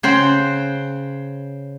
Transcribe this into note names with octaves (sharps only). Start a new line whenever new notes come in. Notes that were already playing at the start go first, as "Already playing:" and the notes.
C#3 C5 F#5 G5